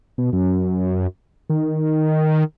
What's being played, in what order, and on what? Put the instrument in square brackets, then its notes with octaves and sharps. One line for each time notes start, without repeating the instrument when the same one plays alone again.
[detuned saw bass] B2
F#2
D#3